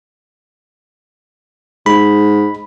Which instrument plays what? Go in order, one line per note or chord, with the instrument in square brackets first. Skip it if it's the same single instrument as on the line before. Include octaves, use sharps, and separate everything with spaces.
[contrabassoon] G#2 [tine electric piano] B5